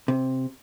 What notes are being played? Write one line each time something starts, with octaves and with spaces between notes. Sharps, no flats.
C3